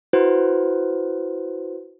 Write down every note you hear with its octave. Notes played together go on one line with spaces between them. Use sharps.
E4 F#4 B4 C5